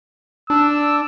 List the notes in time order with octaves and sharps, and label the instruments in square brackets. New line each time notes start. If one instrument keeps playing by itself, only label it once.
[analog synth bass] D4 [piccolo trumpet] E6